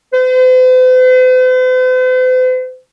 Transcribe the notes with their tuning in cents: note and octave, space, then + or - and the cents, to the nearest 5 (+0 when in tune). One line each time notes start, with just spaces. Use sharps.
C5 -45